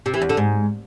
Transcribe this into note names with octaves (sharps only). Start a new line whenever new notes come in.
C3
E3
E2
D3
G#2